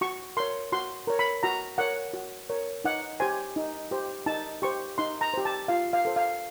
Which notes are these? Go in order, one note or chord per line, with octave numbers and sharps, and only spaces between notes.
F#4 C#6
A#4 C#5 C6
F#4 C6
A#4 C#5
B5
F#4 A#5
A#4 C#5 F#5
F#4
A#4 C#5
D#4 F#5
G4 C5 G#5
D#4
G4 C5
D#4 A5
G4 C5 C#6
D#4 C6
A#5
G4 C5
A5
F4 F5
F5
A4 C5
F5